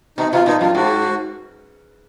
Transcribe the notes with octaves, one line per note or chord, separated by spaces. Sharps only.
B2 D#4
B2 F4
A#2 D#4
F#2 F4
G#2 F#4